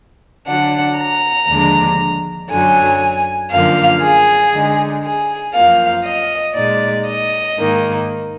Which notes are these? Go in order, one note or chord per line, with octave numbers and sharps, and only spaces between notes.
D3 F#3 D4 F#5
A#5
D#2 D3 F3 G#3 D4
F#2 D3 F#3 G#5
F#2 D3 F3 A#3 F5
G#4
D3 G#3 D#4
G#4
F#2 F3 A#3 F5
D#5
A#2 G#3 D#4 D5
D#5
G#2 D#3 A#3